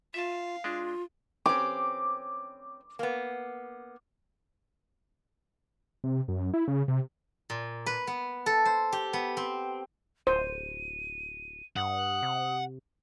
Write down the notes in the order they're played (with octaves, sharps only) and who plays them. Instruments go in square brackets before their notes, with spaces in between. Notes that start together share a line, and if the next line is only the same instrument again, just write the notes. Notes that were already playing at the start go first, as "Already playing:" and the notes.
[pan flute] F4 [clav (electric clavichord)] E5 A5 [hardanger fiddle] F5
[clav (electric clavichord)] G#3 D4 [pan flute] F4
[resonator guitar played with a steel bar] C4 C#4 [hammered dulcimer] D6
[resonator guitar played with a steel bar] A#3 B3
[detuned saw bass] C3
F#2
E4
C#3
C3
[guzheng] A#2
B4
B3
A4
C5
G4
B3
C4
[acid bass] D1 [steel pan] C5 [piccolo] D#7
[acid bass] G2 [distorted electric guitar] F#5 [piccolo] D#6
[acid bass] C3